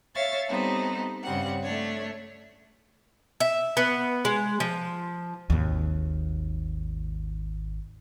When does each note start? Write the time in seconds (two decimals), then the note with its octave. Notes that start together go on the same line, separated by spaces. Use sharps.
0.15 C#5 E5 F5 A6
0.48 G3 B3 C4 D#4 A4
1.23 G2 C#3 G3 C4 F#5
1.62 A3 D4 C#5
3.40 E5
3.77 B3
4.25 G#3
4.60 F3
5.50 G#1 D#2